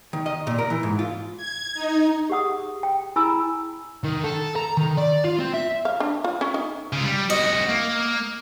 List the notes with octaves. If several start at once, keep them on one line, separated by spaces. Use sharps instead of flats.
D#3
D#5
A#2
A#4
E3
G#2
F4
G#6
D#4
G4 G#4 F#5 D#6
G5
E4 G#4 G#5 A#5 B5 E6
D#3
A4
A#5
D#3
D5
F4
C4
E5
F5
D4
F4
C#4
D#4
C#3 F4
G3
C2 F#4 D#5
A#3